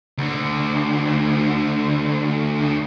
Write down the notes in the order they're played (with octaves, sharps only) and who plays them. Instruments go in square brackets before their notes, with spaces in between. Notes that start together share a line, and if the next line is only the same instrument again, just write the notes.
[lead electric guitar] D2 D3